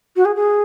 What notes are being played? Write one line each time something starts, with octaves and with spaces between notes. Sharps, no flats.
F#4
G#4
G#4